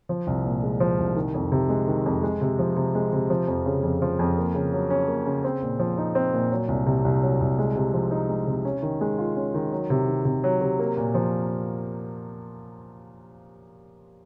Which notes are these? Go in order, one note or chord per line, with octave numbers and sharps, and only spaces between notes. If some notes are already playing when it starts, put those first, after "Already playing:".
F3
C2
A#2
G#3
F3
C2
D#3
F2
C3
G#3
D#3
F2
G#3
C3
F3
C3
G#3
C3
F3
F2
C#3
F2
F3
F2
A#3
C#3
F#3
C#4
A#3
C#3
C4
A#2
F3
D#4
C4
A#2
F#3
C2
C3
C2
F#3
C2
G#3
C3
F3
D#4
G#3
C3
C#4
D#3
G#3
F4
C#4
D#3
F#3
C3
D#3
C3
F#3
C3
A#3
A#2
F3